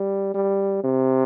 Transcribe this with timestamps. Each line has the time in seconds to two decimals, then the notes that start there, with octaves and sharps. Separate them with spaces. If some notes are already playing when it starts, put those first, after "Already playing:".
Already playing: G3
0.34 G3
0.84 C3